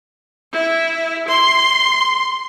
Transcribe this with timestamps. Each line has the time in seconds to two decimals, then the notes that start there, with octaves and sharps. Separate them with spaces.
0.52 E4
1.28 C6